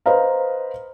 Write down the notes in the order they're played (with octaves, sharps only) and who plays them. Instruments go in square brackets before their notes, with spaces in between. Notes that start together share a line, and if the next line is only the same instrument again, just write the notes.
[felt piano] B4 C5 D#5 F5 A#5